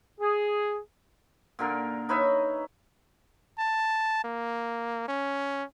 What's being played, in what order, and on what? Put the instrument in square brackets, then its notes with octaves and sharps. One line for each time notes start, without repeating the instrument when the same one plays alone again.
[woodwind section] G#4
[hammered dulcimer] A#2 D3 A#4
D#4 B4 C#5 E5
[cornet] A5
A#3
C#4